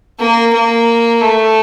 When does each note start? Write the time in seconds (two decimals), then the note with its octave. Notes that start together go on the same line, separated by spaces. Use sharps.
0.19 A#3
0.53 A#3
1.21 A3